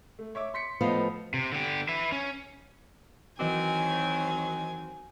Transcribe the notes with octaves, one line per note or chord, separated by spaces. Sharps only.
A3
C#5 E5 D6
C6 B6 C#7
A2 F3 A3 B3 D#5 F5
C3
D3 G4
B4 E5
C#4
D#3 E3 F#3 C4 D#5 G#5 D6